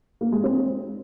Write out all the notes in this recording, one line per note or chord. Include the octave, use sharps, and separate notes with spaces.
A#3
G#3
C4